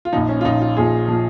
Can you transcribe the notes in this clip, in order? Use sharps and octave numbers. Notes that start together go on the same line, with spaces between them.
F4
A#1 A#2 F3 D#4
C#4
F4
A#1 A#2 F3 D#4
F4
A#1 A#2 F3 G#4
A#2 F3